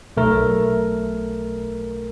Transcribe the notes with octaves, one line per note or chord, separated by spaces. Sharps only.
B1 A3 A#4